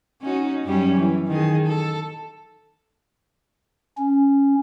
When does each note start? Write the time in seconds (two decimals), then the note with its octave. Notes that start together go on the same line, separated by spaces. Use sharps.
0.21 C#4 D#4 F#4
0.64 F#2 G3 C#4
0.97 E3
1.28 D#3 G#4
1.67 A4
3.98 C#4